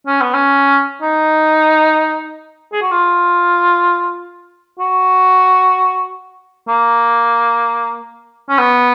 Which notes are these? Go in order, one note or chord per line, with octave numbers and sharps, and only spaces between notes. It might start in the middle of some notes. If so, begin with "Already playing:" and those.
C#4
B3
C#4
D#4
G#4
F#4
F4
F#4
A#3
C#4
B3